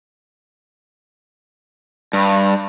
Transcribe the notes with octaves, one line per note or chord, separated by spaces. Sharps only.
G2